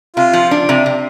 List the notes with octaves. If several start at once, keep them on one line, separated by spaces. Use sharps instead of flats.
C3 F4
F3
D4
C3
C3